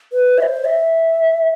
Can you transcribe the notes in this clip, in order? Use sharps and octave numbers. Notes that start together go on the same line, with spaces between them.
B4
E5
C5
E5